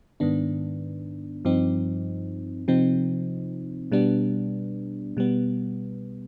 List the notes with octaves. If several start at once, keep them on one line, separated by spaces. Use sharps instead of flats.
G#2 D#3 B3 D4
G2 F3 C4 D#4
C3 F3 C4 D#4
B2 G3 B3 D4
B2 G3 B3